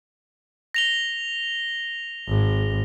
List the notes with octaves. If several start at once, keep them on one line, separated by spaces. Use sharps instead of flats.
A#6 F7 G7
G#1